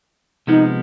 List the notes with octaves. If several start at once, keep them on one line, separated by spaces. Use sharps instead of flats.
C3 F3 G#3 B3 D#4